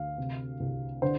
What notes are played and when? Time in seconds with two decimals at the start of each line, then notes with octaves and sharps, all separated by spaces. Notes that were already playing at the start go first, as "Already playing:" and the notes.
Already playing: D2 F5
0.18 C3
0.60 C2
1.02 D3 C5